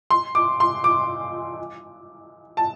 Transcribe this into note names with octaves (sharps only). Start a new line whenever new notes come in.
C6
D6
C6
D6
A5